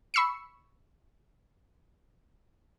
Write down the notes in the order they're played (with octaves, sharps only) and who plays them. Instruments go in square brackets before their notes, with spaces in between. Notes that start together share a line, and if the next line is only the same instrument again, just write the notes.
[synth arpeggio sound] B5 C#6 E6 C7 C#7